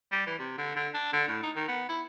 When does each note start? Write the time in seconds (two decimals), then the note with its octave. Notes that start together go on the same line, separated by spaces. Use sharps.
0.12 G3
0.27 E3
0.39 C3
0.58 D3
0.76 D3
0.94 D4
1.13 D3
1.28 A2
1.43 D#4
1.56 D#3
1.68 B3
1.89 E4